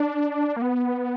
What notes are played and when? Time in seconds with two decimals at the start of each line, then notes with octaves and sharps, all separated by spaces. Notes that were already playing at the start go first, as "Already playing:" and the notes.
Already playing: D4
0.56 A#3
0.62 B3